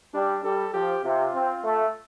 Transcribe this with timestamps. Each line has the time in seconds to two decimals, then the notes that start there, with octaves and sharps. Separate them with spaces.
0.14 G3 D4
0.44 G3 A4
0.73 F3 G4
1.04 C3 F4
1.34 C4
1.64 A3